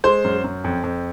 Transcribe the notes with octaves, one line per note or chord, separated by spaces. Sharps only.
G#3 C5 C6
F#2
F#2
F2
F2